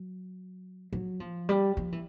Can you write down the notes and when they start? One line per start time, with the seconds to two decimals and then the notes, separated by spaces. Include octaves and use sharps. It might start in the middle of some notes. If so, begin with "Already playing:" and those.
Already playing: F#3
0.93 F#3
1.20 F3
1.49 G3
1.77 F3
1.92 E3